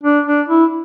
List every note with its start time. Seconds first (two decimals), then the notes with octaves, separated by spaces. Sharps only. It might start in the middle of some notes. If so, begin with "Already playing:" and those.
0.04 D4
0.26 D4
0.49 E4